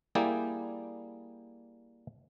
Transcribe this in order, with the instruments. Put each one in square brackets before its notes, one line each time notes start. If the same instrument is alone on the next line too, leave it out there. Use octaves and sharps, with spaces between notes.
[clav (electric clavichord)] G3 A#3 E4 G#4 D5 G5